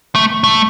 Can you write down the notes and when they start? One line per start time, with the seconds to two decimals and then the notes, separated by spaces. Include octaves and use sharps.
0.15 A3
0.44 A3